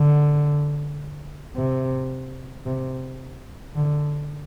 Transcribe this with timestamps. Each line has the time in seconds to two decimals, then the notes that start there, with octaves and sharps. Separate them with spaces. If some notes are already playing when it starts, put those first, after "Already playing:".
Already playing: D3
1.56 C3
2.66 C3
3.75 D3